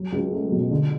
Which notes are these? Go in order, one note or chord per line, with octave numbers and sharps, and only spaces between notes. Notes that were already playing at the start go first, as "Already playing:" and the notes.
Already playing: F#3
C#2
A3
B2
D3